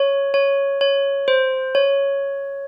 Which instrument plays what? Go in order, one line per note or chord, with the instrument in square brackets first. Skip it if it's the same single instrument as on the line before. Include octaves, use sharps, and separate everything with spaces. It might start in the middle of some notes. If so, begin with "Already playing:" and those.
Already playing: [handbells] C#5
C#5
C#5
C5
C#5